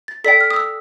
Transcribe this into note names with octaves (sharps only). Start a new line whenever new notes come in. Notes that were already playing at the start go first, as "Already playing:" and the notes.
A6
A4 D5 G5 B6
F6
D#6
E6